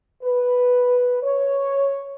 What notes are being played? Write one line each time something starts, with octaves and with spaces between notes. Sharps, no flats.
B4
C#5